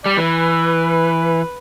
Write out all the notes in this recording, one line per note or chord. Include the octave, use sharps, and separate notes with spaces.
G3 D5
E3 B4